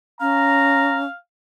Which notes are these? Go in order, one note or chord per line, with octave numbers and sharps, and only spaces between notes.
C#4 F5 A#5